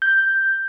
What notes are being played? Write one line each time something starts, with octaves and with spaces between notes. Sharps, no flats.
G6